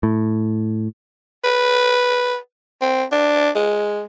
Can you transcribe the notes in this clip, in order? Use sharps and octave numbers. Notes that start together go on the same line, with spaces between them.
A2
B4
C4
D4
G#3